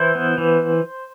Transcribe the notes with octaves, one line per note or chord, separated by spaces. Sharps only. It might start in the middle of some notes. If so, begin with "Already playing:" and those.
Already playing: E3 E4 C5
B3
E3